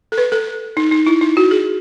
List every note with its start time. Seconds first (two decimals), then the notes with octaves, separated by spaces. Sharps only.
0.12 A4
0.18 B4
0.32 A4
0.77 D#4
0.91 D#4
1.07 E4
1.21 D#4
1.37 F#4
1.51 G#4